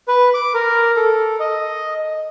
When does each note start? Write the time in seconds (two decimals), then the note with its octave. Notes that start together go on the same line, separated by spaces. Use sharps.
0.08 B4
0.34 D6
0.54 A#4
0.96 A4
1.40 D#5